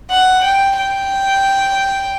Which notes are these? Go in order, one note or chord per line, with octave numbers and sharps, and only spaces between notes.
F#5
G5
G5